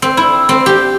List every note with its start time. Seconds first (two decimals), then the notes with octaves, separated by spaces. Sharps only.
0.02 C4
0.17 E4
0.49 C4
0.66 G4